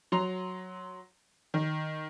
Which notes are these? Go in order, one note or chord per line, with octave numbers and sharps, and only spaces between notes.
F#3 A#5 C6 F7
D#3